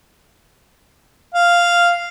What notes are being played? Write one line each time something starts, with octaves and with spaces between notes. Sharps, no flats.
F5